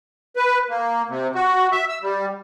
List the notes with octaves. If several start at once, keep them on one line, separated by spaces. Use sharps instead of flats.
B4
A#3
C3
F#4
E5
E6
G3